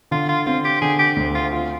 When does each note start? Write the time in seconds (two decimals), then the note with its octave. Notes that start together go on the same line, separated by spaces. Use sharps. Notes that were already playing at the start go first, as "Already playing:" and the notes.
0.11 D3 F4
0.29 F4
0.46 C4 F4
0.65 G4
0.82 D3 G#4
0.99 G4
1.16 D2
1.35 F4
1.53 F4